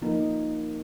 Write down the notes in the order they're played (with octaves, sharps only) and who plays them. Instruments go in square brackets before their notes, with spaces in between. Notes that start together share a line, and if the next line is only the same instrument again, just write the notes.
[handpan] F3 A#3 D#4 A#4